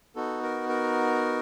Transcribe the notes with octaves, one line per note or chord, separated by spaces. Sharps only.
B3 D#4 F#4 A4
A#4
A#4